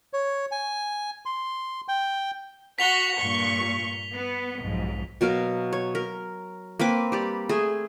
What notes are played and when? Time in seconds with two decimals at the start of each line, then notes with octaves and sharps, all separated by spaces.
0.13 C#5
0.52 G#5
1.26 C6
1.88 G5
2.79 F#4 B6 F7 G7
3.20 G2 A#2 C#6
4.14 B3
4.61 B1 F2 G#2
5.21 B2 F#3 A#4 F5
5.73 C#5
5.95 A#4
6.79 A#3 C4 B4 D6
7.12 G3 G4 D5
7.49 A3 G#4